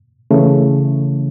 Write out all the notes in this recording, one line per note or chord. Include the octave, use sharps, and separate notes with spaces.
C#3 E3 A3